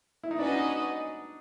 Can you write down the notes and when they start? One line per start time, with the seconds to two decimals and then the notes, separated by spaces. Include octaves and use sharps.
0.24 E4
0.31 D#4
0.39 C#4 D4 F#4 B4 D#5
0.54 D#4